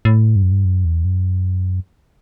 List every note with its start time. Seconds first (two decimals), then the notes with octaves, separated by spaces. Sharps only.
0.05 A2
0.36 G2
0.43 F#2
0.52 G2
0.65 F#2
0.85 E2
1.05 F#2